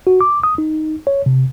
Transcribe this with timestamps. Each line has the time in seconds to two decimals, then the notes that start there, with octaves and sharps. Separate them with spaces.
0.07 F#4
0.21 D6
0.43 D#6
0.58 D#4
1.07 C#5
1.26 C3